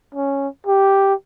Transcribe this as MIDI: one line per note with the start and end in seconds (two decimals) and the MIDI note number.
0.15 0.48 61
0.67 1.14 67